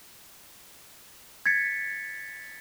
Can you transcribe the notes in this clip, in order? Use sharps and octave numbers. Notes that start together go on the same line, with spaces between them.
G#6 A6 B6 C#7